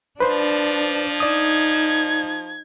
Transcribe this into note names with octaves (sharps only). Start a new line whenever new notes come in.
F3 D4 B4 C5
D#4 D5 D#6 G#6